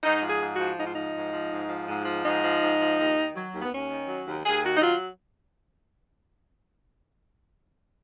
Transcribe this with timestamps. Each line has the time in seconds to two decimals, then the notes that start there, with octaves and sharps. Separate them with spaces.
0.03 G#2 D#4
0.22 F3
0.27 G#4
0.41 G#2
0.53 F#4
0.58 F3
0.77 G#2 D#4
0.84 F4
0.93 F3 D#4
1.14 G#2
1.33 F3
1.51 G#2
1.68 F3
1.88 G#2
2.05 F3
2.24 G#2 D#4
2.43 F3
2.61 G#2
2.79 F3
2.98 D#2
3.17 D#3
3.35 F#3
3.53 D#2
3.62 B3
3.71 D#2 C#4
3.90 D#3
4.08 F#3
4.26 D#2
4.45 D#2 G#4
4.63 D#3 F#4
4.77 D#4
4.82 F#3 F4